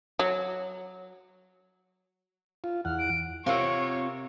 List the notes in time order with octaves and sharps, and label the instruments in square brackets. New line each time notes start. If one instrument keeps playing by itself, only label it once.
[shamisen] F#3
[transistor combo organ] F4
[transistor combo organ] E2 F#5 [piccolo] F6
[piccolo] D7
[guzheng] C3 A#4 F#5 [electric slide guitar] C4 F4 [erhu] C#5 [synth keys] F5 E6